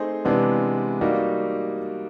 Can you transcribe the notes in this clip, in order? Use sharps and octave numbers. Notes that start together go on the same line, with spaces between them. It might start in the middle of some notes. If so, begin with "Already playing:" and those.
Already playing: A3 C4 D#4 G#4 C5
C3 E3 G#3 B3 D4
G3 A#3 D#4 F#4